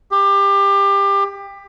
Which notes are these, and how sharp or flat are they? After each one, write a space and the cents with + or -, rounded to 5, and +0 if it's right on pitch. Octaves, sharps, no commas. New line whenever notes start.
G4 +25